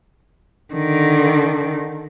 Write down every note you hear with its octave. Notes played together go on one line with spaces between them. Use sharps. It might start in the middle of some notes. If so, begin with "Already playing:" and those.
D3 D#3